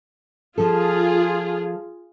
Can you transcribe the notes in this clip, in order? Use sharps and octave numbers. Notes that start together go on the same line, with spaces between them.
F3 F4 G#4 A4